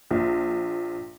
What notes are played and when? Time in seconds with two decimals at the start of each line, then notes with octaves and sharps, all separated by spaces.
0.11 A#1 F4